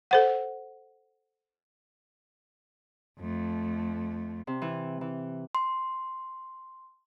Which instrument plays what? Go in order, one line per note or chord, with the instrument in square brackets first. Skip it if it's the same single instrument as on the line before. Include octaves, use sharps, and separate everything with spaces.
[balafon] A4 C5 F#5
[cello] F2 A3
[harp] C3
E3
E3
[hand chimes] C6